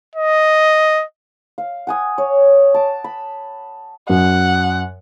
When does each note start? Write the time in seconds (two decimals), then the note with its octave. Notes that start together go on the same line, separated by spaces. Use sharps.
0.15 D#5
1.58 F5
1.87 F#5 G#5 D#6
2.18 C#5
2.74 A5 D6
3.04 B5
4.09 F#2 F#5